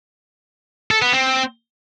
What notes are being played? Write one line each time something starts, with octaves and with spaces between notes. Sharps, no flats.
A4
B3
C4